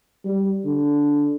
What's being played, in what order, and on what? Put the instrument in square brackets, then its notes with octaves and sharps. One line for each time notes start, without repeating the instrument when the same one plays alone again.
[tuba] G3
D3